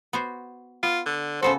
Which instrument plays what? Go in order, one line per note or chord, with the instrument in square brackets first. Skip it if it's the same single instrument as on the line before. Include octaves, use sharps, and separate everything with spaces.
[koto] B3 F#4 C5
[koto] B3 [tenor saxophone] F4
[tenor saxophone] D3
[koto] C#3 B3 F#4 [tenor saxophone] A4 [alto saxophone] C5